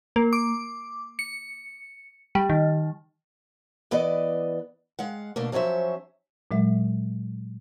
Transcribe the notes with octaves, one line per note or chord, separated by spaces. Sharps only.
A#3
D6
C#7
G3
D#3
E3 B3 B4 D5 D#5
G#3 F5 F#5
B2 D3 A3 A#3
F3 F#3 C#4 C5 E5
A#2 F#3 G#3 E5